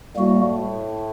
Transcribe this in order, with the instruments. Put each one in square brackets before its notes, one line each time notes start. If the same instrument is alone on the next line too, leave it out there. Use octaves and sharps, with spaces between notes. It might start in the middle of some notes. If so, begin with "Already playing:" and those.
[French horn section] A2 [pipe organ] G3 A#3 F#4